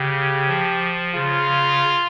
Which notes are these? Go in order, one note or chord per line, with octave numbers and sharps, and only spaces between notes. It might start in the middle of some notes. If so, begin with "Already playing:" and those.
Already playing: C#3 G4
F3
C#3 F4